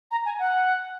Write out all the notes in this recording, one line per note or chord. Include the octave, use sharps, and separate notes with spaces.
A#5
G#5
F#5